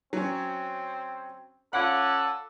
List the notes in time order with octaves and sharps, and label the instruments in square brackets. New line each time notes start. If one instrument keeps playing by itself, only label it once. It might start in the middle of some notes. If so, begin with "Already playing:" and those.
[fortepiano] F#3 C#4 [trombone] C4
[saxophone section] C#4 D5 F#5 [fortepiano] F4 B5 [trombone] A4